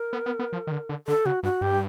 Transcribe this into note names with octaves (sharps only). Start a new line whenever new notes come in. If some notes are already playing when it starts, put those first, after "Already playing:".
Already playing: A#4
B3
B3
B3
F3
D#3
D3
D3
D3 A4
C#3 F#4
G2 F#4
G2 G4